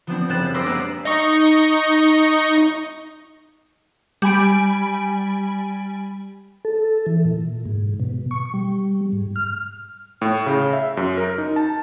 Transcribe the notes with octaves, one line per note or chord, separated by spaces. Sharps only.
F3 B3 C4 D4
F#1 G3 C5 F#6 A6 E7
B4 C5 C6 D6 E6 A#6
G#3 A#3 B3 D4 G#4
D#4 D#5 C#6
G3 G#5 B5 D7
A4
E3
A#2
G#2
B2
C#6
G3
G#2
F6
A2
C#3
E5
F#2
A#4
D#4
A5